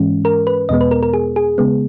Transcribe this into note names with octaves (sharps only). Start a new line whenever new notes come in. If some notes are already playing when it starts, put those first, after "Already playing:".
Already playing: G#2 E3 G#3 C#4
A#4
B4
E2 B2 G#3 B3 D#5
B4
A#4
A#4
G#4
G#4
C#3 G#3 B3